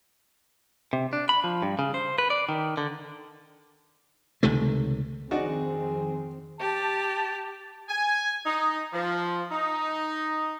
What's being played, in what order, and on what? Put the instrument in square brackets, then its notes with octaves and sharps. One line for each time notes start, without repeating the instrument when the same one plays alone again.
[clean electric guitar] C3
D4
B5
F3
G2
C#3
C5
B4
D5
D#3
D3
[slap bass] C#2 C3 D#3 A3
[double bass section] F2 D#3 C4 [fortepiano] D4 D#4 F#4 [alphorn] G#4
[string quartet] G4 [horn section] A5
[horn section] G#5
D#4
F3
D#4